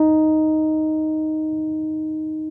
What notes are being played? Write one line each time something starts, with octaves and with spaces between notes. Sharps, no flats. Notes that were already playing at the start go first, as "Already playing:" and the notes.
Already playing: D#4